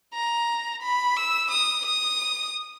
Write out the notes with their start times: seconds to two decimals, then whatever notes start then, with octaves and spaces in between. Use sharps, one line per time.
0.14 A#5
0.82 B5
1.16 E6
1.51 D#6
1.85 D#6